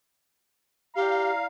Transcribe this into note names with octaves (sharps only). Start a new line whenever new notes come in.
E4 G4 D5 F5 A#5